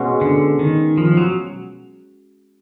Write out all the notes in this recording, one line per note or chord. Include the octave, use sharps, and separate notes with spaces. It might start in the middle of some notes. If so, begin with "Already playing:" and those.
Already playing: B2 G#3 C#4 F#4
D3
D#3
F3
F#3